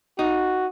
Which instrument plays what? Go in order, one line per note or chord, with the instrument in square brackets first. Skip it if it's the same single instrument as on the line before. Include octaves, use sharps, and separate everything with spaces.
[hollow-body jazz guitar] D#4 [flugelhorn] F#4